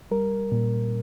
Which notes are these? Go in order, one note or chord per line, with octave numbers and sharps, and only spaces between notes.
G3 A#4
A#2